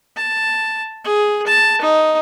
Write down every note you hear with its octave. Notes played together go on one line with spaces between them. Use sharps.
A5
G#4
A5
D#4